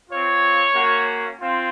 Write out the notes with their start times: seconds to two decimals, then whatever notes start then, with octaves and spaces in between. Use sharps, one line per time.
0.09 C4 F4 C#5
0.74 A#3 C#4 F#4
1.40 C4 F4